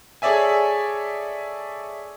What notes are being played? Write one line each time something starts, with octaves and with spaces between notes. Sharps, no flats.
G#4 A4 C#5 D5 E5 G#5